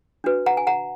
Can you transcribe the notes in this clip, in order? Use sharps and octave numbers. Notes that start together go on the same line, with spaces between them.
D4 F#4 B4
F#5 A#5
G#5
F#5 A#5